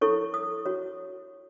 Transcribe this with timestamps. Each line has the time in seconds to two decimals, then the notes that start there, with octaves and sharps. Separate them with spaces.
0.01 E4 A4 C#5 C#6
0.34 D#6
0.66 F#4 C#5